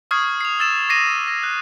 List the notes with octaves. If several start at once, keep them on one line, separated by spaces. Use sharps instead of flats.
C#6 D#6 F6 G#6 C7
C7 F7
E6 A6 E7
D6 A#6 C7 D#7
A#6
F#6